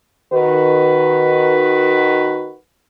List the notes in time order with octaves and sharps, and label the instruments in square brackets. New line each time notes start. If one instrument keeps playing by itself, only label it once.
[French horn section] D#3 F#4 B4